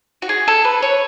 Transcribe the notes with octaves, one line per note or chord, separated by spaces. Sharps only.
F#4
G#4
A4
B4
C#5